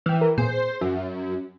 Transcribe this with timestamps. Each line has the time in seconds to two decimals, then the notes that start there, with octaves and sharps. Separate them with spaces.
0.06 E3 G5 F6
0.21 A#4
0.38 A#2 B3 G#4 C5
0.81 F#2 E5